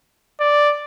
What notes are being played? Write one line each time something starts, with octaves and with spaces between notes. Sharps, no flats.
D5